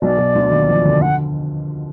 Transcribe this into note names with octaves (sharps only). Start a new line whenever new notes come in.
B1 B2 D5
B1 B2
D2 D3
D#2 D#3
F2 F3
D2 D3
D3 F#5